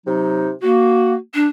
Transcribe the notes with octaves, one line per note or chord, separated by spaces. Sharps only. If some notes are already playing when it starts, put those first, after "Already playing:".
C3 F#3 D#4
A#3 F#4
D4